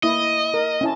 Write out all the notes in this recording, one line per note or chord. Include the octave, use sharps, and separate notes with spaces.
A#3 E4 D#5
A#4
C#4 E4 A5